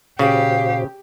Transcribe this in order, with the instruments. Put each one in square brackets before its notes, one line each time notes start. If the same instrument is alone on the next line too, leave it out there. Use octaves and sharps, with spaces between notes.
[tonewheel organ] A#2 F#4 C5 [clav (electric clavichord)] C#3 [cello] G4 [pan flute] F5